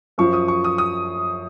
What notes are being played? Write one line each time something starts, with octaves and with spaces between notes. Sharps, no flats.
F#2 F3 C#6
D#6
C#6
D#6
D#6